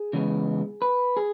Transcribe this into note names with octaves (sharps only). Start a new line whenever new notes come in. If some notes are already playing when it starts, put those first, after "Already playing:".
Already playing: G#4
C#3 E3 G#3 B3
B4
G#4